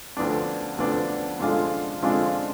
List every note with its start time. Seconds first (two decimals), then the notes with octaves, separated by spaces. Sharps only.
0.17 D2 D3 F3 B3 D4
0.78 D2 D3 F3 B3 D4
1.40 D3 F3 G#3 D4 F4
2.02 D3 F3 G#3 D4 F4